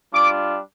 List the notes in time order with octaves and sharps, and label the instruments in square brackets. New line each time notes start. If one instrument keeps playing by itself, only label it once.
[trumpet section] G3 D4 F4 D6